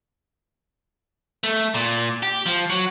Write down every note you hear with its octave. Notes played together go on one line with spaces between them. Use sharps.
A3
A#2
G4
F3
F#3